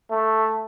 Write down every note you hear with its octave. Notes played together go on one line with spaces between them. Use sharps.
A3